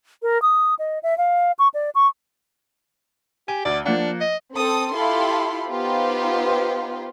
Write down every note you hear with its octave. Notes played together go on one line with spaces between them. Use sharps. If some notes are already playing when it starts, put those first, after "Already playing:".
A#4
D#6
D#5
E5
F5
C#6
D5
C#6
G4 G#5
D2 D5
F3 A#3 D4 F#5
D#5
C4 A4 D#6
E4 F4 G4 A4 B5 C6
B3 D#4 F4 G4 B4 C5